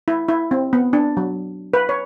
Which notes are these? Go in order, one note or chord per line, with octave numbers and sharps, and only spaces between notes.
E4
E4
C4
B3
D4
F#3
B4
C#5